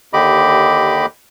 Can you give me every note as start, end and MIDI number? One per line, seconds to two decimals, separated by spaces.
0.13 1.06 39
0.13 1.06 50
0.13 1.06 67
0.13 1.06 75
0.13 1.06 83
0.13 1.06 86